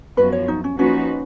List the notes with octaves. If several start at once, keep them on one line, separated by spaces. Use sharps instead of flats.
F#2 F3 B3 F#4 B4
C#5
D#4
C#4
F3 A#3 C#4 D#4 F#4 B4